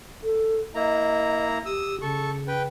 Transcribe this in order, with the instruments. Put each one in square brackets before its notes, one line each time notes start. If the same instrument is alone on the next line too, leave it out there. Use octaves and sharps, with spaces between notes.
[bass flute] A4
[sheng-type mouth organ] A#3 E4 A#5 [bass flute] D#5
[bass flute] G4 [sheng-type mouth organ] D#6 E6
[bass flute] C#3 [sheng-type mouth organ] A4 C#6
[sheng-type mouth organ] B4 G5